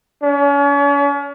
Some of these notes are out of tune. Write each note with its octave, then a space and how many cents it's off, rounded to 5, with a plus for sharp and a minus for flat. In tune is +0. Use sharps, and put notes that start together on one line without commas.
C#4 +40